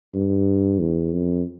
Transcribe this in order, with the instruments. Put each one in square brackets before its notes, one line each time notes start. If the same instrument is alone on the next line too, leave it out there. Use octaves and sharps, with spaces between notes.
[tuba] G2
E2
F2